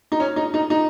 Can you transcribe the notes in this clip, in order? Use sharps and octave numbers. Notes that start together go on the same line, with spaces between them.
D#4
C#4
D#4
D#4
D#4